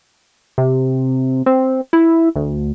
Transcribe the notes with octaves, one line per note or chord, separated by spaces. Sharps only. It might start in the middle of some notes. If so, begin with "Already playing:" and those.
C3
C4
E4
D2